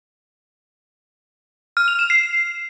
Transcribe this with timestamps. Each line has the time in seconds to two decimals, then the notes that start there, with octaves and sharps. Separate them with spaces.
1.77 F6
1.88 F7
1.99 E7
2.10 C7